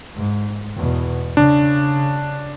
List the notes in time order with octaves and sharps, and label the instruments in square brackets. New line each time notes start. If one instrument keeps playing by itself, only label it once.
[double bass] G#2
E2 B2
[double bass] C#3 [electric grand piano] D4